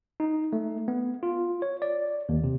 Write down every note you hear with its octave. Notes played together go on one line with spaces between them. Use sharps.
D#4
A3
B3
F4
C#5
D5
D#2
C3